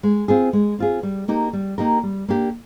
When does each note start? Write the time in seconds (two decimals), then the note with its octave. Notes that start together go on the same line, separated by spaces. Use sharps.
0.03 G#3
0.28 C4 F4 G#4
0.53 G#3
0.78 C4 F4 G#4
1.03 G3
1.28 A#3 D#4 G4 A#4
1.53 G3
1.78 A#3 D#4 G4 A#4
2.03 G3
2.28 A#3 D4 G4